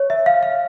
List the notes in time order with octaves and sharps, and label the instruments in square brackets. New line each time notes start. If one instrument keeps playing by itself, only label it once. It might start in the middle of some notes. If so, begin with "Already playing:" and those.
Already playing: [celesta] C#5
E5
F5
F5